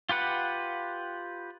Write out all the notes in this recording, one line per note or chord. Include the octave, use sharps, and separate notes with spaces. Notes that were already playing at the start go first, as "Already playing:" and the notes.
F4 G4 B4 F#5